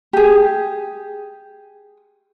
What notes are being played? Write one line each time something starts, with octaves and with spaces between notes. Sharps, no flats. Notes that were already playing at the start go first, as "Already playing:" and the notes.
G4 G#4